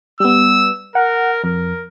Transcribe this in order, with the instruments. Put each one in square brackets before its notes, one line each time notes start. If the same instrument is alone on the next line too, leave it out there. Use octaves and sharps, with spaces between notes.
[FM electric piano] G3 B3 [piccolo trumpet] E6
[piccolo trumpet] A#4 [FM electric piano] F#5
[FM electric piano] F2 [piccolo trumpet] A#4